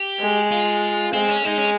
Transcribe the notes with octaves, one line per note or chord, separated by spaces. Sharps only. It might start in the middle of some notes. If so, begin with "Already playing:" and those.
Already playing: G4
G#3
F4
G#3 C4
C#4
G#3 D#4
C#4